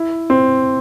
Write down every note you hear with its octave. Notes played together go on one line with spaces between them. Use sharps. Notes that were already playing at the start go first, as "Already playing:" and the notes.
Already playing: E4
C4